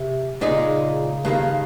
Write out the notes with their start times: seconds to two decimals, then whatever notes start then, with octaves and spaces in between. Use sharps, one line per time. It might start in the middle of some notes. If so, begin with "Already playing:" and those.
Already playing: C3
0.41 A#2 C#3 G#3 D#4
1.25 G2 D#3 A#3